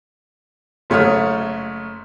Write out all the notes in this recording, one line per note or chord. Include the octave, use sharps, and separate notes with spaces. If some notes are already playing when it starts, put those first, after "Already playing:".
F#1 A3 C#5 D#6 F6